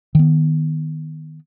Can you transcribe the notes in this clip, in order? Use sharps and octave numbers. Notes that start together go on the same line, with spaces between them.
D#3 B3